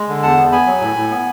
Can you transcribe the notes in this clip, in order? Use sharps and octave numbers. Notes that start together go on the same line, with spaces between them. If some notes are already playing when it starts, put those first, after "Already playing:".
Already playing: G#3
D3
E2 F#5 A5
B3
B3 G#5 B5
F#3
A2
A2
B3